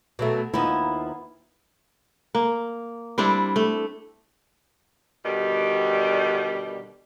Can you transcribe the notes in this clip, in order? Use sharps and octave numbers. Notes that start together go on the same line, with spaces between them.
B2 F#3 A3
D#2 F3 B3 D#4 E4
A#3
G3 C4 D4 E4
A3
B2 D3 D#3 G3